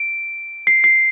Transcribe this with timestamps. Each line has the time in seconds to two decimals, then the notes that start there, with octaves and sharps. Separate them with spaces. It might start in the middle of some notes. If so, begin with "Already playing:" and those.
Already playing: D7
0.67 C7
0.84 C7